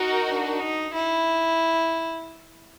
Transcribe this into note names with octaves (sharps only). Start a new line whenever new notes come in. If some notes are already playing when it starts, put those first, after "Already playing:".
Already playing: D#4 F#4 A#4
D4
D#4
E4